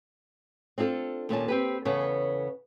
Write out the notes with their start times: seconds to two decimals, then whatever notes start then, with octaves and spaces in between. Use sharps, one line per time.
0.78 C4 D4 F4 G#4 A4
1.29 D#2 A#2 C#4 A5
1.48 C4 G4 B4
1.85 E2 C#3 B3 A4 C#5